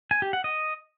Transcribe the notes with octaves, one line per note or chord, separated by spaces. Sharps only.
G#5
G4
F#5
D#5